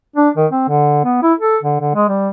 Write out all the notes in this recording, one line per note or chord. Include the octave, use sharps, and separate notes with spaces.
D4
D#3
C4
D3
B3
E4
A4
D3
D3
G#3
G3